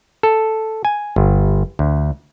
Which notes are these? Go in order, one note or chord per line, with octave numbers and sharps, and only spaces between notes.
A4
G#5
G1
D2